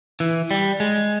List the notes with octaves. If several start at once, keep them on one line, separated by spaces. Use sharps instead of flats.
E3
G3
G#3